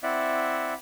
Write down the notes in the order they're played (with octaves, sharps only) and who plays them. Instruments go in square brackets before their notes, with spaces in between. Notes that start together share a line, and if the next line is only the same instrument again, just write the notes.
[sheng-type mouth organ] C4 E4 D5 E5 F#5